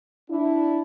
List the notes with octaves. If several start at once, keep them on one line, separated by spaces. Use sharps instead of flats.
D4 E4